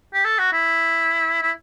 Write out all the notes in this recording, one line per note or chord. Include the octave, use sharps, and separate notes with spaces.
G4
A4
F#4
E4
E4